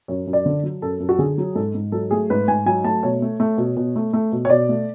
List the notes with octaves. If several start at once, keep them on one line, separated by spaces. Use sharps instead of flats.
F#2 C#5
F#2
D5
D3
F#3
F#2 A4
F#2
F#4
D3 G#4
F#3
G#2 A4
G#2
F#3 A4
A3 G#4
G#2 B4
G#2 G#5
F#3 G#5
A3 A5
B2 C#5
A3
A3
B2
B2
A3
A3
B2
C#5
B2 D5
A3